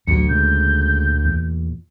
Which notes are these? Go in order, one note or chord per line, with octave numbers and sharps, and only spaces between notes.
A1 D2 F#3 C#7
A#2 C#3 G#3 G6
E2 A#2